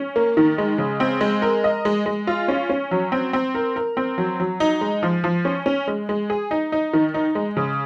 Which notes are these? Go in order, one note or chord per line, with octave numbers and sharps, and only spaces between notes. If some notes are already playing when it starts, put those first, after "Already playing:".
Already playing: C#4
A#3
D#3
G#3
C#3
C4
G#3
A#4
D#5
G#3
G#3
F4
C#4
C#4
F#3
C4
C4
A#4
A#4
C4
F#3
F#3
D#4
G#3
F3
F3
C#4
C#4
G#3
G#3
G#4
D#4
D#4
D#3
D#4
G#3
C#3